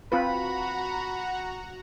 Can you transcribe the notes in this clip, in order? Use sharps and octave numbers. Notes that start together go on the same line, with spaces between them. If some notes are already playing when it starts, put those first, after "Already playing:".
C4 F4 F#4 B4 F#5 A#5 B5